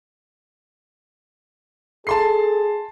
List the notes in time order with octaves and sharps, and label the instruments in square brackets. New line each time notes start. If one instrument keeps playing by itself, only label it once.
[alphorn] G#4 [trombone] A4 [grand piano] A5 C6 C7